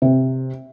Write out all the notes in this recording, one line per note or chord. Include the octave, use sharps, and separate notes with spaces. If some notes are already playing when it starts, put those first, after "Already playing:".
C3